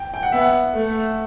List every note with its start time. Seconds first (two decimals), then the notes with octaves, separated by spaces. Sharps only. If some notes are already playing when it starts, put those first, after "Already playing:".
Already playing: G5
0.14 G5
0.23 F#5
0.32 B3 E5
0.41 F#5
0.75 A3